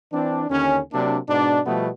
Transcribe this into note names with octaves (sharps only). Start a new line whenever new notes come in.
E3 C4 D4
D#2 D3 C#4
C3 F#3 A#3 D4
G#2 B2 D4
B2 F3 G3 A3 B3